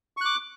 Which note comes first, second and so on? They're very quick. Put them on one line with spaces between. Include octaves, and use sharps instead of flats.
C#6 F#6 D6